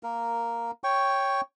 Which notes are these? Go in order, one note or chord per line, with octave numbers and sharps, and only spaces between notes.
A#3 A#4
C#5 G5 C#6